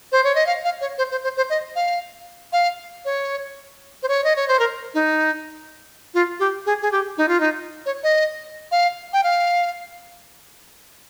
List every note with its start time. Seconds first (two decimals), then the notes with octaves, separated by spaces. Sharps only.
0.12 C5
0.24 C#5
0.35 D#5
0.47 F5
0.64 F5
0.81 C#5
0.98 C5
1.12 C5
1.24 C5
1.37 C5
1.50 D#5
1.76 F5
2.53 F5
3.05 C#5
4.03 C5
4.08 C#5
4.24 D#5
4.36 C#5
4.48 C5
4.59 A#4
4.94 D#4
6.14 F4
6.39 G4
6.66 G#4
6.82 G#4
6.92 G4
7.18 D#4
7.28 F4
7.40 D#4
7.86 C#5
8.03 D#5
8.72 F5
9.13 G5
9.24 F5